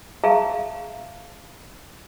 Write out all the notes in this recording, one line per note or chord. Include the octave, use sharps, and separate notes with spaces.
G#4 E5 F5 A5 A#5